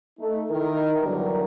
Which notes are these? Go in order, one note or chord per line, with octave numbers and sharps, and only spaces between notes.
A3 D#4
D#3 E4 A#4
E2 G2 D3 F#3 G3 A#4